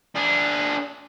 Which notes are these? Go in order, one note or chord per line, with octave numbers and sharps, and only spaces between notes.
D4 G#4